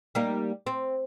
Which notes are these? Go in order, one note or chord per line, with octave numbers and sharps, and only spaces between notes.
G3 A#3 D#4
C4